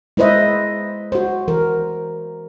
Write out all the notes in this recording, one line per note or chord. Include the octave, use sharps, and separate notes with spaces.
G#3 E4 B4 C5 D#5 E5
F#4 C5
E3 A#4